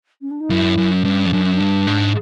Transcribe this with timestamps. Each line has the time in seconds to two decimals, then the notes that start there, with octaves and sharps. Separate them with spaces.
0.21 C#4
0.30 D4
0.40 D#4
0.50 F#2 E4
0.77 F#2
0.91 C#4
1.05 G2
1.26 F2
1.32 F#2 D4
1.44 C#4
1.55 D4
1.60 G2
1.87 G#2